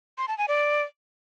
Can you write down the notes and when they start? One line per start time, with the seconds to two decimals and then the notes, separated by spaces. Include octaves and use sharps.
0.18 C6
0.28 A5
0.38 G#5
0.48 D5